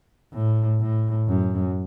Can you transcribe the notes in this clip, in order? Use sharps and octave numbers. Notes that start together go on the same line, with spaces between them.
A2
A2
F#2